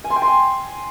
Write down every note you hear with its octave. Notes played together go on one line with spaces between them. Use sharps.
G#5
C6
G5
C6
G#5